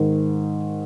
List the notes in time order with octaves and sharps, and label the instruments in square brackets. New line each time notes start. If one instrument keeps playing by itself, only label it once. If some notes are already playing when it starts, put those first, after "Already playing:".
Already playing: [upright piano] G#2 D#3